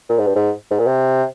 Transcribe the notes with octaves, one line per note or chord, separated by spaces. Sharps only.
A#2
G#2
G2
G#2
G#2
A#2
C3